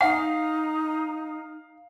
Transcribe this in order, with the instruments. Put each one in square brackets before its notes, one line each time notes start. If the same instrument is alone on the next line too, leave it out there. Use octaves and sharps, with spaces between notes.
[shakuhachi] D#4 [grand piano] F5 [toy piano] F#5